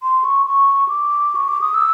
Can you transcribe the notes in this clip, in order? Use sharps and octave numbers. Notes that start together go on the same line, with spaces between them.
C6
C#6
C#6
D6
C#6
D6
D#6
E6